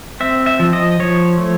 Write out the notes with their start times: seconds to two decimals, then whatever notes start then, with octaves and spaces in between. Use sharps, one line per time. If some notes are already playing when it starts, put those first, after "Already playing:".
0.20 C4 E5
0.46 E5
0.59 F3
0.73 D#5
1.00 F3 C#5
1.38 A3